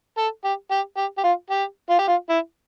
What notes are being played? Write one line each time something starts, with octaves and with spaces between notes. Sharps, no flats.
A4
G4
G4
G4
G4
F4
G4
F4
G4
F4
E4